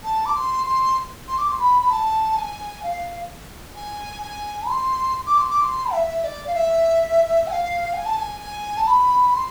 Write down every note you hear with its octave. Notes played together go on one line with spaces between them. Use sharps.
A5
D6
C6
C6
C6
D6
C6
B5
B5
A5
G#5
F5
G#5
G#5
C6
D6
C6
D6
C6
E5
D5
F5
E5
G#5
F5
G#5
A5
G#5
G#5
A5
B5
C6